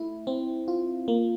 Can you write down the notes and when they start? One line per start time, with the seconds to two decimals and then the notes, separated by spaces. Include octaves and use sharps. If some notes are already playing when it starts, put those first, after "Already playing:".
Already playing: A3 E4
0.27 C4
0.68 F4
1.08 A#3